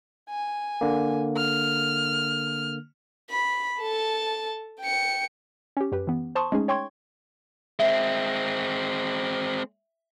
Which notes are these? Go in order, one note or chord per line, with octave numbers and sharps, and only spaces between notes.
G#5
D3 A#3
F6
B5
A4 A5
G5 C#7
C#4 G4
F#2 G4 B4
E3 B3
C5 A5 C6 C#6 D#6
G#3 A3 C#4 D#4 G#4
C#5 G5 C6 C#6 G#6
G#3 C4 E5